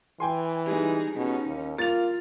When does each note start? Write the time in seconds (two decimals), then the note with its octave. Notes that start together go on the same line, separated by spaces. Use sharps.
0.20 E3 G5 G#5 C6
0.67 G3 G#3 D#4 G#4
1.16 B2 C#4 D#4
1.46 D#2
1.78 A#3 F4 A6 F7